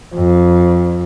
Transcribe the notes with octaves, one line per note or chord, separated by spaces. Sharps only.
F2